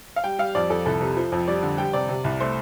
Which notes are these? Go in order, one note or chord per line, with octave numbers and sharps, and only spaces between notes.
F5
G3 G5
G3 F5
F2 D5
F2 A4
C2 A4
C3
F3
F2
G3 D5
D3
G3 G5
C3 D5
C3
C2
A3 C5